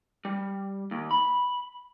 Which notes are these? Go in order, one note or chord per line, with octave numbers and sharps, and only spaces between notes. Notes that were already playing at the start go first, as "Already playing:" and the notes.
G3
D#2
B5